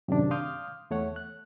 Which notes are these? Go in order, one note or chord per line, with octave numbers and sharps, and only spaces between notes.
F#2 A2 C3 D#3 D4
F5 C6 D6 D#6 F6 G6
E2 A3 C#5 F#5
F#6